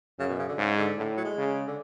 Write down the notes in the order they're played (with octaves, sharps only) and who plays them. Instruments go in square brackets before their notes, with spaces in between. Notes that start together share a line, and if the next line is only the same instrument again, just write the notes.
[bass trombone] F#2 [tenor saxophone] C#3
[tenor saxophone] B2
C#3
D3
[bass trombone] G#2 [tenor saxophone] C#3
[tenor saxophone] D3
[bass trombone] A2 [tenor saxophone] D3
[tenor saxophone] F#3
G#3
[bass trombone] C#3
[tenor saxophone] D3